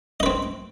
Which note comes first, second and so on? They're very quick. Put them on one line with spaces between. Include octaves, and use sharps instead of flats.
D#5 B4 C4